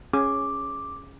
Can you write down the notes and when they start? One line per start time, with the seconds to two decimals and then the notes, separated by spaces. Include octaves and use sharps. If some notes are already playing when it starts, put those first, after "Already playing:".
0.13 C#4 G#4 D6